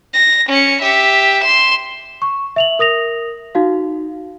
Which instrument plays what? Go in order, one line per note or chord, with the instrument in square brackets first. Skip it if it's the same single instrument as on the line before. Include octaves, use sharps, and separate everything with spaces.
[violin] A#6
C#4 C#7
G4 E5
C6 E7
[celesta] C#6
E5 F7 F#7
A#4 D#6 A#6 F7
D#4 F#4 F5